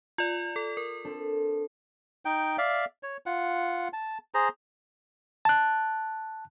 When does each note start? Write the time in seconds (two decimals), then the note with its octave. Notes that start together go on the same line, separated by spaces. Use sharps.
0.18 F4 D5
0.56 A4
0.77 A#4
1.05 C4 D4 A4
2.25 D#4 G5
2.58 D5 E5 F5
3.03 C#5
3.26 F4 F#5
3.93 A5
4.34 G#4 C5 A#5
5.45 A5 F#6